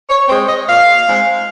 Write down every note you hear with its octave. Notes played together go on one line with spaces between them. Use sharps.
C#5
G#3 C4 C5
D#5
A#2 F5
G#3 C4